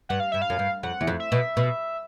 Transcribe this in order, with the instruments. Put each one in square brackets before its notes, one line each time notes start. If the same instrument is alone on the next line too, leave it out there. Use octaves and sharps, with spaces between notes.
[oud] G2 [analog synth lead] F#5
[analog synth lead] F5
[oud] G2 [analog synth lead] E5
[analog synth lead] F5
[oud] F#2
G2
[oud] F2 [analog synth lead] F#5
[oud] E2
F2
[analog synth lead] E5
[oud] B2
B2